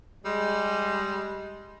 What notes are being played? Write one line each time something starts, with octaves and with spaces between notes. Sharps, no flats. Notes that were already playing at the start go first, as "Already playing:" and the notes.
G3 G#3